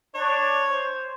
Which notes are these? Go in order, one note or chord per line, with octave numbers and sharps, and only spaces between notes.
D4 C#5
C5